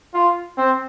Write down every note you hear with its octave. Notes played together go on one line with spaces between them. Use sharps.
F4
C4